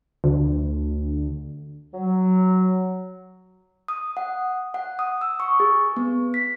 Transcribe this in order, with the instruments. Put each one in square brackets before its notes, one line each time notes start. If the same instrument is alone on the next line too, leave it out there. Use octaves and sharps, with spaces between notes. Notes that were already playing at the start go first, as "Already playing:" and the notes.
[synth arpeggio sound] D2
[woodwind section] F#3
[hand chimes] D#6
F#5
F#5
D#6
E6
C#6
G#4
B3
B6